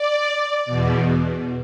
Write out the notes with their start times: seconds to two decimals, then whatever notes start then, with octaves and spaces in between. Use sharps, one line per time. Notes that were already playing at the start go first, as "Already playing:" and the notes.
Already playing: D5
0.65 E2 B2